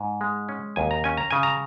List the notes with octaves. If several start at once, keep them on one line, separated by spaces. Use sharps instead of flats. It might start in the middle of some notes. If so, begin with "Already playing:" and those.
Already playing: G#2
G#3
C#4
D#2 G#5
A#5
C#4 G#5
A#5
C#3 G#5
A#5